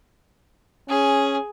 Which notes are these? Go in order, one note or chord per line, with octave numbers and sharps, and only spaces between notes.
C#4 G#4